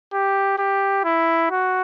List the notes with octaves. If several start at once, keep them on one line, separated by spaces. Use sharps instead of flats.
G4
G4
E4
F#4